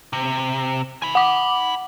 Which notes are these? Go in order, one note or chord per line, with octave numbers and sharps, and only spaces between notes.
C3
G#5 B5
F#5 D6